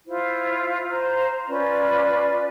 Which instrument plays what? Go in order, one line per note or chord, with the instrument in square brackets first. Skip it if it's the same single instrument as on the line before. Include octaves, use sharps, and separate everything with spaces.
[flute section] E4 F4 C5
C5 A#5
C#4 F4 B4 D5